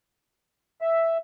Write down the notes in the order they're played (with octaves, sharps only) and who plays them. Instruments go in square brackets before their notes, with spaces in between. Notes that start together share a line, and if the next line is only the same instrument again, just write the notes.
[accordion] E5